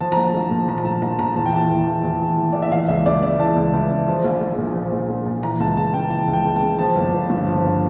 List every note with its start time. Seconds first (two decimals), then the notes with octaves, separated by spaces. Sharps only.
0.01 F3 A5
0.12 A#5
0.17 A#1
0.24 A5
0.34 A#1
0.51 A#2
0.68 F3 A#5
0.78 A#5
0.85 A#1 A5
1.02 A#1 A#5
1.19 A#2 A#5
1.36 E2 A5
1.46 G5
1.53 E3 A5
1.70 E2
1.87 E3
2.03 E2
2.21 E3
2.38 E2
2.52 E3 D5
2.62 E5
2.72 E3 F5
2.88 C#2 E5
3.06 C#2 D5
3.22 C#3 D5
3.39 E3 A5
3.56 C#2
3.73 C#2
3.91 C#3
4.08 F3
4.24 A#1
4.41 A#1
4.58 A#2
4.75 F3
4.93 A#1
5.09 A#1
5.26 A#2
5.43 E3 A#5
5.60 C#2 A5
5.77 C#2 A5
5.94 C#3 G5
6.10 E3 A5
6.28 C#2
6.33 G5
6.45 C#2
6.56 A5
6.62 C#3
6.79 F3 A5
6.96 G1
7.13 G1
7.30 G2
7.47 F3
7.64 G1